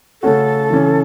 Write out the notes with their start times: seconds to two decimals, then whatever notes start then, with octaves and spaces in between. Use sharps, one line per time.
0.23 C#3 A3 C#4 F#4 A4
0.70 C#3 E3 C#4